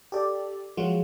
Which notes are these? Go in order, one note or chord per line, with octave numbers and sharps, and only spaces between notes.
G4 A4 D5
F3 F#3 G#3 F4 F#4